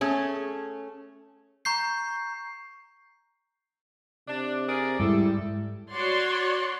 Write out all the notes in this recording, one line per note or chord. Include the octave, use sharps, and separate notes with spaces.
A3 C#4 G#4
A#5 C#6 G6 C7
C3 D4
G#4 A#4 D5
G#2 G3 G#3 E4 A4
F#4 C#5 D5 C6